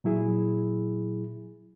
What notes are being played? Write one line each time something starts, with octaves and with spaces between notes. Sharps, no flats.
A#2 F#3 E4 G#4